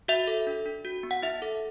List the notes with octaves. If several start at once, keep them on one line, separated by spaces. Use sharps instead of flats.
F#4 E5
A4
D4
D4
F#4
B3
F#5
E4 E5
A4